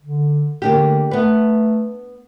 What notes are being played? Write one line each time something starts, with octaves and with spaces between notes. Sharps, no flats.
D3
D3 A#3 D4 G4
A3 B3 B4